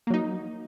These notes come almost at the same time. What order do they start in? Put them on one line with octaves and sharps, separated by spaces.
A#3 F#3 D#4